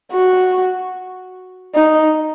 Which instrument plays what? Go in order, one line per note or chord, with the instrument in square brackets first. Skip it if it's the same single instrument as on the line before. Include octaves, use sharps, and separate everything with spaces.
[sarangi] F#4
D#4